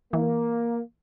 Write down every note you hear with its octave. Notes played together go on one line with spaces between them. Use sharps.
E3 A#3